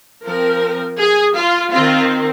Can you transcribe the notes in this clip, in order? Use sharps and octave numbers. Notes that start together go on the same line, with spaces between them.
F3 C4 A#4
G#4
F4
D#3 C4 F4